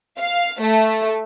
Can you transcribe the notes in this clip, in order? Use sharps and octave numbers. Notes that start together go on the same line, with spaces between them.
F5
A3